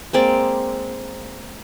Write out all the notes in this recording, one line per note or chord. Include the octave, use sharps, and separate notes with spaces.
G#3 A#3 C4 D5